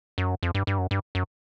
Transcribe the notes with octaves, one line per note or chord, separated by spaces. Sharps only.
F#2
F2
G2
G2
F#2
G2
F#2